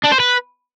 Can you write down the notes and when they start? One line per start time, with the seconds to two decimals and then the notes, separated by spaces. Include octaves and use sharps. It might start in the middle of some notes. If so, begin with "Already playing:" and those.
0.04 D4
0.12 C5
0.20 B4